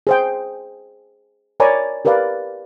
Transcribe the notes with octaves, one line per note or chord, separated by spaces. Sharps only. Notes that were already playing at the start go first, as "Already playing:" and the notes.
G#4 C5 G5
A#4 C#5 D5 G#5 A#5 B5
G4 A#4 B4 D5 F5